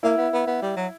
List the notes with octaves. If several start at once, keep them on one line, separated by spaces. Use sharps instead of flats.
A#3 E4
B3
B3
B3
G3
F#3